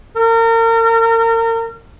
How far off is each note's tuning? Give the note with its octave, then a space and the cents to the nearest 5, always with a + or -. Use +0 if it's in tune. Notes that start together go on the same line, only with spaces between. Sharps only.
A#4 -35